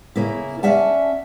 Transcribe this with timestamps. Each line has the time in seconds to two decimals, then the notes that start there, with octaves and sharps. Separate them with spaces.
0.16 C#3 A#3 E4
0.63 C#4 D5 E5 F#5 A5